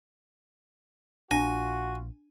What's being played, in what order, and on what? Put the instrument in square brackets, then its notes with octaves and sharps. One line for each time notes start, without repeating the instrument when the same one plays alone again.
[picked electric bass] A#1 [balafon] D4 [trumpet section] F4 F#4 [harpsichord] G#5